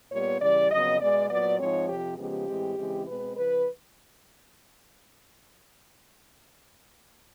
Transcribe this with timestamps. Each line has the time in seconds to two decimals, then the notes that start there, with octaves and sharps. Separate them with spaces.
0.12 A#2 G3 B3 C#5
0.41 C#3 E3 G3 D5
0.71 F2 C#3 F#3 B3 D#5
1.00 B2 G#3 B3 D5
1.30 A#2 F#3 B3 D5
1.59 G#2 F3 G#3 C4 C#5
1.89 F2 C3 F3 G4
2.18 C#3 F3 G#3 B3 G4
2.47 A2 E3 G#3 C4
2.77 C#3 E3 G#3 C4
3.07 B2 G#3 C4 B4
3.37 C#3 F3 B4